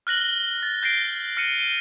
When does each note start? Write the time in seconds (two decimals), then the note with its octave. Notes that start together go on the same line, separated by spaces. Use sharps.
0.07 F6 F#6 A#6 F#7 G7
0.63 A6
0.82 G6 A#6 C7 D7
1.37 F6 A#6 C#7 D#7
1.60 D#7